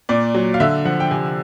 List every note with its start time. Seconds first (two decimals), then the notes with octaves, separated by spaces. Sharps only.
0.09 A#2 D5
0.35 F#3
0.54 F5
0.60 D3 E5
0.85 F3 F#5
1.00 G5
1.11 C3 G#5